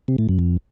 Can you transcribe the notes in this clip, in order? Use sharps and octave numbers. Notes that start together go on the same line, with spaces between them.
C3
A2
F#2
F2